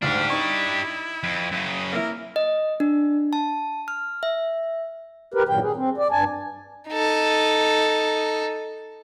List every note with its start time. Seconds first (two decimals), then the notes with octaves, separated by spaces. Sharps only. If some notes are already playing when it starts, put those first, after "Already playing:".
0.02 D2 G#2 D4 G4 F5
0.29 D#4 E4 C#6
1.23 F2
1.52 F#2 C#3
1.93 A#3 E4 A#4
2.36 D#5
2.80 D4
3.33 A5
3.88 F6
4.23 E5
5.34 G4 A#4 B4
5.49 G2 A#2 D#3 F#3 G5
5.62 G#4
5.76 C4
5.98 D5
6.11 G2 G#5 A5
6.89 D#4 A4